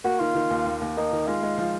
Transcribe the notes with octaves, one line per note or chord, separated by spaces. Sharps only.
A#3 F#4
D#3 F4
D#3
D#2
D#2
D#2
A#3 D#4
D#3
G#3 F4
G#3
F3